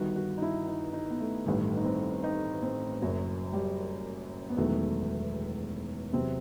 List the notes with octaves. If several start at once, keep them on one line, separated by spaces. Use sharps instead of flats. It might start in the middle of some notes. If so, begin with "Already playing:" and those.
Already playing: G1 G2 D#3 F#4
F#4
D#4
E4
D#4
D#4
B3
A3
A1 G2 D#3 A3
D#4
C4
D#4
C4
F#1 F#2 F#3
G3
B3
E1 E2 D#3 F#3 A3
E2 C3 F#3 C4